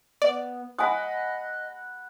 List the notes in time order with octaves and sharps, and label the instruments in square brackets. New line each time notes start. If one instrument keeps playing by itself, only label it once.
[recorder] B3 [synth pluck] D5
[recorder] D#5 [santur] F#5 B5 [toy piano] G#5 D#6